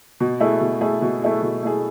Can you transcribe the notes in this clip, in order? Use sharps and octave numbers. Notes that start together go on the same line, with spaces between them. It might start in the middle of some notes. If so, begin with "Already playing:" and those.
B2
A3 E4 G#4
B2
A3 E4 G#4
B2
A3 E4 G#4
B2
A3 E4 G#4